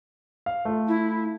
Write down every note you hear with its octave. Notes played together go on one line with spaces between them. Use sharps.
F5
A3 F4
E4